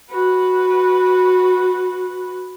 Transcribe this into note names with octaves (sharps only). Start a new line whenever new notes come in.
F#4 B4